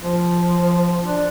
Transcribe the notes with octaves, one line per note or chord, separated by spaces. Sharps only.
F3
D4